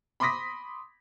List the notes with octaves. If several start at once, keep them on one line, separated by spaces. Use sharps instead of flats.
B5 C6 D6 D#6 A#6 B6